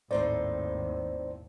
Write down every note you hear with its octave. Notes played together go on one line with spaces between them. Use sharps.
G#1 D#2 A2 C4 D#4 C5 D5